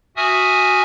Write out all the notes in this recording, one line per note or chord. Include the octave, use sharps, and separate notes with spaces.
F#4 E5 G#5 D#6 F6